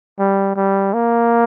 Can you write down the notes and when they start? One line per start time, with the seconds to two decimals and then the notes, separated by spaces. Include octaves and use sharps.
0.19 G3
0.56 G3
0.94 A#3